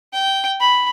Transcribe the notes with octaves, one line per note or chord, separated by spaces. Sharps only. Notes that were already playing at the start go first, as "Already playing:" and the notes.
G5
B5